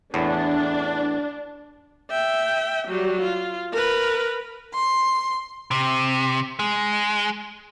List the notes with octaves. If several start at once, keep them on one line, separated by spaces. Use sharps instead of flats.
E2 A2 D4
E5 G5
F#3 G3
F4
A#4 B4
C6
C3
G#3